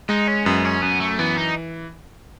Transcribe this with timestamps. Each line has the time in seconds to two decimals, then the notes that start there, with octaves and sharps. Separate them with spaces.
0.09 G#3 D#4
0.28 C#4
0.45 F#2 B3
0.65 C#4
0.82 F#2 B3
1.00 A3
1.19 E3 B3
1.37 D#4